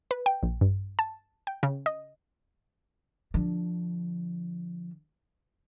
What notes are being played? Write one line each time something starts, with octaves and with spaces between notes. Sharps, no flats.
B4
G5
A#1
G2
A5
G5
C#3
D#5
D3 F3